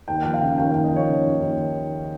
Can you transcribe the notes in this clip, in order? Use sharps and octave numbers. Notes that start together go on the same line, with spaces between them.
D#2 G5
F3 G5
F5
C#3
D#2 G5
D#2 F5
D#5
F3 C#5
C#3
D#2
D#2